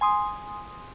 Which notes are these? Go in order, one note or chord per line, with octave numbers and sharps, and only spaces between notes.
G#5 C6 D#6